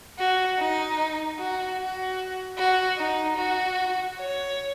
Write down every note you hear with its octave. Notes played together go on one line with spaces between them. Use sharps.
F#4
D#4
F#4
F#4
F#4
D#4
F#4
C#5